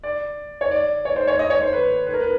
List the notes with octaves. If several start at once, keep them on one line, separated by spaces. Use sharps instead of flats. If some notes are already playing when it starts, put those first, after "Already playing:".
D5
C#5
D5
C#5
C5
C#5
D#5
C#5
C5
B4
B4
A#4
B4